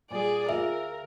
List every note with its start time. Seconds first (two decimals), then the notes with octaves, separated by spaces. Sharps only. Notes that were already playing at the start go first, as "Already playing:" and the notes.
0.10 A#2 G3 G#4 D5
0.49 D2 F4 G#4 A#4 E5